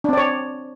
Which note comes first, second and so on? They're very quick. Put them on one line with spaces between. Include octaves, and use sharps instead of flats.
D4 C4 D5 C#5